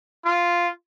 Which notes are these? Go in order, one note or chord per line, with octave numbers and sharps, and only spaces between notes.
F4